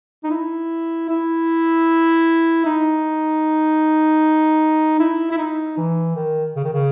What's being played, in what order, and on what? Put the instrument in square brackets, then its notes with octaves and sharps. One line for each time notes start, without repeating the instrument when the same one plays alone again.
[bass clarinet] D#4
E4
E4
D#4
E4
E4
D#4
E3
D#3
C#3
D#3
C#3